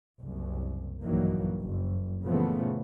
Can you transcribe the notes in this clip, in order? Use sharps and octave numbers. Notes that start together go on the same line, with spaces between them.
F#1 C2
A#1 G2 D#3 E3 F#3 A#3
F#1
A#2 C#3 E3 F3 A3 B3